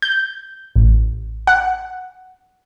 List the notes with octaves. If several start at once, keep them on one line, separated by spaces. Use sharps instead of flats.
G6
A1
F#5